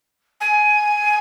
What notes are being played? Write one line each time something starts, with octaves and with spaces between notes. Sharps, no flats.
G#5